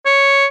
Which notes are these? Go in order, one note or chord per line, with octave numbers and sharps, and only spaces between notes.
C#5